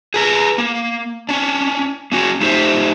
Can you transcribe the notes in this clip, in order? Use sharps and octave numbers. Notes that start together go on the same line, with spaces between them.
G#4 B4 A#5
A#3
C#4 D4
A#3 C#4 F#4
A3 D#4 G4 A#4 C5 E5